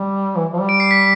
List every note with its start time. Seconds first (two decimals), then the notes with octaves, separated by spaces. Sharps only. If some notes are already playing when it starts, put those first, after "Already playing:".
Already playing: G3
0.37 E3
0.53 F3
0.61 G3
0.69 D7
0.80 C7
0.91 B6